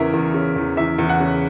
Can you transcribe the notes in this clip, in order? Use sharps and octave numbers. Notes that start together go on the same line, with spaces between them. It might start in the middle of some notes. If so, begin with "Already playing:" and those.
Already playing: E2 C#3 E3 A#4 E5
E2
C#3
E2
E3 E5
E2
F#5
C#3